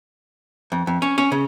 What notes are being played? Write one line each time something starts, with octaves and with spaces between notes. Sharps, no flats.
F2
F2
C#4
C#4
C#3